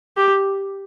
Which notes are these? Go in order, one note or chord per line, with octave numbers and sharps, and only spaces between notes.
G4